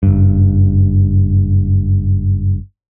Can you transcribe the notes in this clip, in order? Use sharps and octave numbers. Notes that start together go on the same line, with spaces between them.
F#1 G2